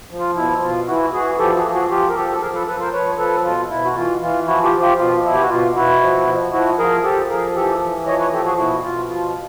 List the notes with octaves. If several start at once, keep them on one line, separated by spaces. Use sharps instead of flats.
F3
F4
B2 E4
B2 F4
E3 E4 F#4
E3 F#4 G#4
F3 G4 A4
F#4 G#4
F3
F#4 G#4
F3 F4 G4
A#4
F3 G4 A4
A4
F3 G#4 A#4
A4 B4
F3 A4 B4
A#4 C5
F3 B4 C#5
F3 A4 B4
B2 F4
B2 E4
F#4
E3 F4
E3 F4
F3 E4 F#4
F4 G4
F3
F4 G4
B2 F4
B2 E4
G4
F#4
B2 F4
B2 E4 F#4
F3
F3
F3 E4 F#4
F3 G#4 A#4
F3 G4 A4
F3 G#4 A#4
E3 G4 A4
E3
F3 C#5 D#5
B4 C#5
F3 G4 A4
F#4 G#4
B2 E4 F#4
B2 F4
F3 F4